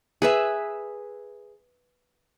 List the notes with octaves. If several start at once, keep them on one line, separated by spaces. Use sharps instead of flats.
G#4 B4 E5